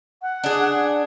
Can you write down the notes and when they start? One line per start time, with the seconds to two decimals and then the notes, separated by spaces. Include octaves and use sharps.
0.22 F#5
0.44 D4 G#4